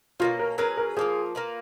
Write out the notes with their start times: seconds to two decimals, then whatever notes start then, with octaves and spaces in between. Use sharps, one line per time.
0.20 B2 A#3 C#4 F4
0.39 A#4
0.58 F#3 C#4 G#4 A#4 B4
0.77 A#4
0.97 F3 A#3 F4 G#4
1.35 A#3 F4 B4